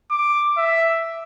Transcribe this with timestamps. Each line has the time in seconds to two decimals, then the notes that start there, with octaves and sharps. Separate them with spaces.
0.11 D6
0.58 E5